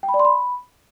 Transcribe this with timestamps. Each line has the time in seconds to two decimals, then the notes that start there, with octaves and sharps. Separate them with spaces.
0.03 G5
0.09 B5
0.14 D5
0.19 C6
0.25 B5